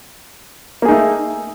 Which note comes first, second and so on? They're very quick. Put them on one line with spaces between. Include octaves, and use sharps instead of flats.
A#3 G#4 D#4 A3